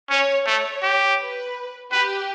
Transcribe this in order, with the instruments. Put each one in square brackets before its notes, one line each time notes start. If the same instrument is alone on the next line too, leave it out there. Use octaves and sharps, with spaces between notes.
[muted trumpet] C#4 [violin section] C#5
[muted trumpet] A3 [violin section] C#5
[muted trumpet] G4
[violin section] B4
[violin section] G4 [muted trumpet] B4